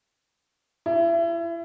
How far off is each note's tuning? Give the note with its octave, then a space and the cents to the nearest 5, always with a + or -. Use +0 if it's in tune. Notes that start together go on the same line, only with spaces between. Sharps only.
E4 +30